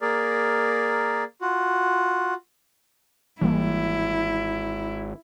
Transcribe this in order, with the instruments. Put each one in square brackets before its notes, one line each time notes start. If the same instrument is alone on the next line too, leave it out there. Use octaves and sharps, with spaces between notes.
[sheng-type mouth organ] A#3 G#4 A#4 D5
F4 F#4
[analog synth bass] G#1 [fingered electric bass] E3 G3 A#3 [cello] E4